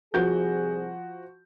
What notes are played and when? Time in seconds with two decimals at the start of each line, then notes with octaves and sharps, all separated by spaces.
0.14 C2 C3 F3 F#4 G#4 G6